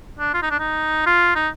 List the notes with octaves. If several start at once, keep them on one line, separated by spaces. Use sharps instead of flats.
D4
F4
D#4
D4
D#4
F4
D#4